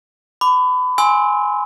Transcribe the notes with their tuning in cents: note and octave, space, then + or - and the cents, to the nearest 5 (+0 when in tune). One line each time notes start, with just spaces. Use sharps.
B5 +30 D6 +0
G#5 +0 C6 +10 E6 -30